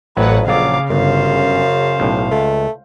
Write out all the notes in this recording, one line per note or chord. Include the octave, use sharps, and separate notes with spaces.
A1 F2 A2 F#3 B4 F#5
A#1 C#3 F#3 D5 F5 D6
G1 F#2 C5 F5
B1 A2
C#2 A3